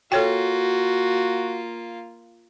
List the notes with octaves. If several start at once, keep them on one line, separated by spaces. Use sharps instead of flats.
A#3 F4 F#4 A4 C#5 G5